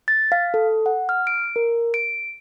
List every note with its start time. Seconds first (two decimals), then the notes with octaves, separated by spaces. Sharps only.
0.08 A6
0.32 F5
0.54 A4
0.86 F#5
1.09 F6
1.27 D7
1.56 A#4
1.94 D7